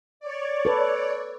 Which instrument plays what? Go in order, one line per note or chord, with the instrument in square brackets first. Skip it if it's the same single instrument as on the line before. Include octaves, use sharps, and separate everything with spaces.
[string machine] C#5 D5
[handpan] A4 B4